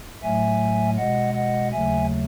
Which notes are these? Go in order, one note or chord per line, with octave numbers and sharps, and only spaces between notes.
A2 F#3 A3 E5 G#5
B2 G#3 D#5 F#5
D#5 F#5
D#2 C#3 F#3 A3 E5 G#5